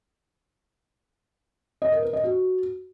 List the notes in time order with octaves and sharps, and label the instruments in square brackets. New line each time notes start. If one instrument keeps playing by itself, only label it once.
[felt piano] D#5
A#4
B4
D#5
F#4